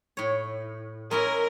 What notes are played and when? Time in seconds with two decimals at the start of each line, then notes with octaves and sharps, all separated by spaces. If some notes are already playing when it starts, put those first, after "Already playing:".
0.17 A2 C#5
1.11 G#3 C#4 E4 A#4